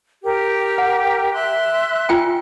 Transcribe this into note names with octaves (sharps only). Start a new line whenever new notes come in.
G4 A#4 G5
F#5
E5 C6 F#6
F4 G5 G#5